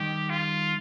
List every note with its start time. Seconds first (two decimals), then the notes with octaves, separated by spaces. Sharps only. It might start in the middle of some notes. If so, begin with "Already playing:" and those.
Already playing: D#3 G3 G4
0.30 F4